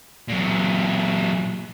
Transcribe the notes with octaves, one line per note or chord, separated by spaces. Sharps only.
A#2 F#3